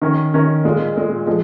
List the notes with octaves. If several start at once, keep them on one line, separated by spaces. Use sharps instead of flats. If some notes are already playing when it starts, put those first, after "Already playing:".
D#3 C#4 A#4
D#3 C#4 A#4
A#2 G#3 F4
A#2 G#3 F4
F3 G#3